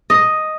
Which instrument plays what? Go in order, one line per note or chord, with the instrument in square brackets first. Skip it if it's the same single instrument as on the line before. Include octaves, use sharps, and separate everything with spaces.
[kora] D#5